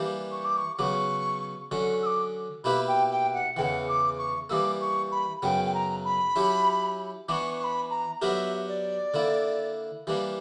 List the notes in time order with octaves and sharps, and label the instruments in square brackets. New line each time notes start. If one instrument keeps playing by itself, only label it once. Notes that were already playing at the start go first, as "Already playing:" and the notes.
Already playing: [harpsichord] E3 G3 A#3 D4 G4
[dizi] C#6
D6
C#6
[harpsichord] C#3 F#3 B3 [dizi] C#6 D6
[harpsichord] D3 F#3 C#4 [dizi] C#6
[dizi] E6
D6
[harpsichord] B2 A#3 E4 G4 B4 [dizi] B5
[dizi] G5
G5
F#5
[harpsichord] E2 C#3 E3 [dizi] F#5 G5
[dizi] D6
C#6
[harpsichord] E3 G3 A#3 [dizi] D6 E6
[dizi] C#6
B5
[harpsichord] F#2 C#3 F#3 B3 [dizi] G5
[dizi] G5
A#5
B5
[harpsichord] F#3 C#4 E4 G4
[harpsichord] E3 B3 D4 [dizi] C#6 D6
[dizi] C#6
B5
A#5
[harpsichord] F#3 B3 D4 G4 A#4 [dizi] E5
[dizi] D5
[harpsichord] D3 A#3 E4
E3 G3 A#3 D4